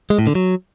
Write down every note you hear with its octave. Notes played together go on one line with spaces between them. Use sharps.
G#3
A2
D3
F#3